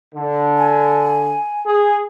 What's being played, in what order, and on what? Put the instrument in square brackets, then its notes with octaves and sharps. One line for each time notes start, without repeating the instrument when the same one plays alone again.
[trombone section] D3
[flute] G#5
[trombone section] G#4